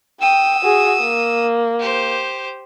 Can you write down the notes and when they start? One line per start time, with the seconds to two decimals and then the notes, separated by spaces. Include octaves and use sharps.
0.21 G5 D#6 E6
0.63 F#4 G#4
1.01 A#3
1.79 G4 C5